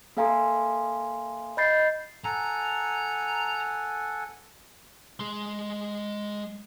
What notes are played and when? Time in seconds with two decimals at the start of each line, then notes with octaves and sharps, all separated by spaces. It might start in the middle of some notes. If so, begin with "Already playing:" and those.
0.17 A#3 A4 F5 G#5 A#5 C6
1.57 D#5 B5 G6 A6 C7
2.24 A4 F#5 G#5 A#5
5.20 G#3 C6